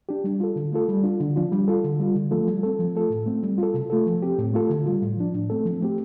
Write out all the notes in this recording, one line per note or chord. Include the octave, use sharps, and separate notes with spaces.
D4 G4
G3
F4 A4
D3
A3 F4 A4
G3
D4 F4
D3
F3 D4 F4
G3
F4 A4
D3
G3 F4
D3
F3 A3 F4 A4
G3
C4 A4
F3
A3 F4 A4
A2
A3 C4
G3
F4 A4
C3
A3 F4 A4
F3
C4 G4
A2
A3 F4 A4
D3
G3 F4
A2
F3 D4
A2
A3 C4 A4
F3
A3 C4 G4